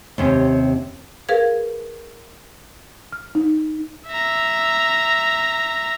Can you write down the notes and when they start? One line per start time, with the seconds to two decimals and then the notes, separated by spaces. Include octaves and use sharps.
0.18 D#2 C3 C#4
1.29 G#4 A#4 B4 F5 G#6
3.12 F6
3.35 D#4
4.09 E5 A#5